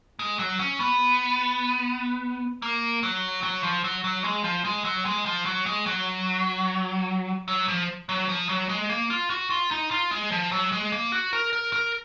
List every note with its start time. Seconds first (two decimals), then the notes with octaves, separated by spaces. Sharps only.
0.19 G#3
0.39 F#3
0.59 C#4
0.80 B3
2.62 A#3
3.03 F#3
3.43 F#3
3.63 F3
3.84 F#3
4.04 F#3
4.24 G#3
4.44 F3
4.65 G#3
4.85 F#3
5.05 G#3
5.26 F3
5.45 F#3
5.66 G#3
5.86 F#3
7.48 F#3
7.68 F3
8.09 F#3
8.29 F3
8.49 F#3
8.69 G#3
8.89 A#3
9.10 F4
9.30 F#4
9.50 F4
9.71 D#4
9.91 F4
10.11 G#3
10.32 F3
10.52 F#3
10.72 G#3
10.92 A#3
11.12 F#4
11.33 A#4
11.53 A#4
11.73 A#4